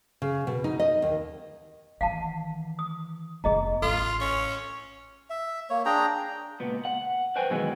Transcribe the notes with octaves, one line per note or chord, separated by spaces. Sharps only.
C#3
B2
D#4
D#5
D#2
D#3 E3 F5 F#5 A5
D#6
F1 B3 G#4 D#5 A#5
A1 F4 A4
C#4
E5
A#3 C#5
D4 G#4 G5 A#5
C#2 A#2 B3
F#5
B4 C5 G5 G#5
F#2 B2 D#3 E3 G#3 B3